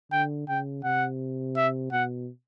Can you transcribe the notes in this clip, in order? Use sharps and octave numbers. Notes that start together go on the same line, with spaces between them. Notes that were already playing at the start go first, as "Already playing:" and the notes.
D3 G5
C#3 G5
C3 F#5
E5
B2 F#5